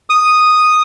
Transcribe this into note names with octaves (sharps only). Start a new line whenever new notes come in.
D#6